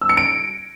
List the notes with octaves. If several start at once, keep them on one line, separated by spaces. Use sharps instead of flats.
E6
C#7
D7